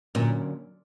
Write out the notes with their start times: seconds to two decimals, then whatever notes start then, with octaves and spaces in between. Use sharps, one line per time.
0.15 A#2 D3 F#3 A#3 C#4